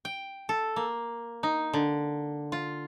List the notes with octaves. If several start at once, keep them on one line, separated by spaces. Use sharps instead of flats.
G5
A4
A#3
D#4
D3
F4